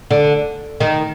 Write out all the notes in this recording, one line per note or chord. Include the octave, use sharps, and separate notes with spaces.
D3
D#3